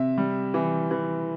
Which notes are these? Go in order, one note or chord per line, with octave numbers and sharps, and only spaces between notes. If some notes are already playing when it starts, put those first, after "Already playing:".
Already playing: C3 E5
G3
E3
E3